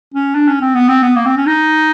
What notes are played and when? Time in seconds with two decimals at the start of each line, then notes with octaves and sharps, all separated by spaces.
0.14 C#4
0.35 D4
0.48 C#4
0.61 C4
0.75 B3
0.88 C4
1.02 B3
1.16 A#3
1.26 C4
1.37 C#4
1.46 D#4